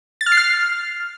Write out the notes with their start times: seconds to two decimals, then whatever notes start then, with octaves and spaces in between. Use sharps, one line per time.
0.21 A6
0.26 F6
0.32 C7
0.37 F6